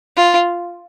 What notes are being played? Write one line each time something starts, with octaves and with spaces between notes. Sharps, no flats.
F4